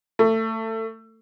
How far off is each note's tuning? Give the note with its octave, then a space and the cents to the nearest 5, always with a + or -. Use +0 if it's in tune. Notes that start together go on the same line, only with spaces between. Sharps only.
A3 +25